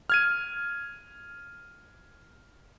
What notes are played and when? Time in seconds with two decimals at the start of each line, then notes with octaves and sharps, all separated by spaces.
0.10 F6 G#6 D#7